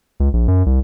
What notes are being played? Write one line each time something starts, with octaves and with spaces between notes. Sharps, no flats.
C#2
A#1
F#2
C2